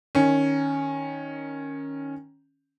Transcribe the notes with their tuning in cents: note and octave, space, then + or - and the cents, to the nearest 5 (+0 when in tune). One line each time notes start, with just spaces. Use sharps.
D#3 +0 C#4 +0